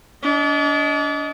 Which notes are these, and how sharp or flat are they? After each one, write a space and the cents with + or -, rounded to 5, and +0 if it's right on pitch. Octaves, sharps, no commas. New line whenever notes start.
D4 -35 D#5 +10